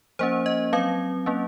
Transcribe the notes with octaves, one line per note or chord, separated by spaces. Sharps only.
F3 A#3 C#4 C5
D#5
F#3 C4 F5
F#3 A#3 C#4